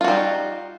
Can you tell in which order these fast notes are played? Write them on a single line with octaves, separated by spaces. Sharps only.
F4 F#4 G3 D#4